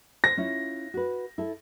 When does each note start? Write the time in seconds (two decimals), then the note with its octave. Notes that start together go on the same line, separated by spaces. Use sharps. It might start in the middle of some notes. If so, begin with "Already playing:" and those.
0.24 C5 A#6
0.37 C#4 E4 F4
0.94 F#4 B4
1.38 E4 A4